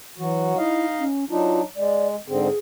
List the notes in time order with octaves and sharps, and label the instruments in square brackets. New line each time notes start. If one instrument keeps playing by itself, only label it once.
[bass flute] E3 [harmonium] F#3 F#4
[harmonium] D#4 D#5 F5 [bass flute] E4
[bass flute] C#4
[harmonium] F#3 D4 D#4 [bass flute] F4
[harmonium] G#3 [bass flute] D5
[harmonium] G#2 D3 C4 [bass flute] G#4